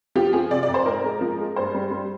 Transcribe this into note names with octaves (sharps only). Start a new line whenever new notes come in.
F3 G4
F3 G#4
C3 D5
D5
F2
C5
G#2 A#4
G#3
F3
G#3
G2 C5
G3
G3